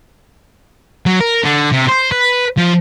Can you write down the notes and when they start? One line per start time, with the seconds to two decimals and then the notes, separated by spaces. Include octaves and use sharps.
1.06 F#3
1.20 A#4
1.43 D3
1.72 C3
1.88 C5
2.12 B4
2.57 F3